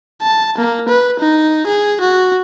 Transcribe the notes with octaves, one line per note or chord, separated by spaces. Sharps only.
A5
A#3
B4
D#4
G#4
F#4